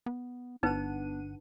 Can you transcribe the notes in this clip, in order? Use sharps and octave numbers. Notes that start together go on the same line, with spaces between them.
B3
G1 B3 D4 D#4 B4 F#5 D#7